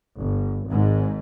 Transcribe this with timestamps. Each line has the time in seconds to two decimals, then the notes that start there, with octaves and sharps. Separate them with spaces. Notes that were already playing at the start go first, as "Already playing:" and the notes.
0.19 G1
0.68 G#1 G#2